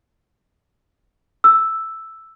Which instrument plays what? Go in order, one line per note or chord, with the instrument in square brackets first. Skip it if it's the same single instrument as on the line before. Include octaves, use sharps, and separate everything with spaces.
[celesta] E6